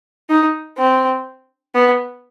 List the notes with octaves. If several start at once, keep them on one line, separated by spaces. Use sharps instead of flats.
D#4
C4
B3